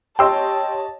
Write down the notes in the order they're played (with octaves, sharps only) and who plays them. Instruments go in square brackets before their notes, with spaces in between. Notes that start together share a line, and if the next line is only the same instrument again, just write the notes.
[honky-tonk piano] G4 C#5 D#5 [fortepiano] G5 C6 E6 [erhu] A5